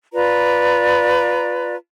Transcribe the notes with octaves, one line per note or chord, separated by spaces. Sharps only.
F4 B4 D5 A#5